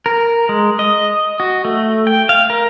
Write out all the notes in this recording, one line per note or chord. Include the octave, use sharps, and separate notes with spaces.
A#4
G#3
D#5
F#4
A3
G5
F5
A#4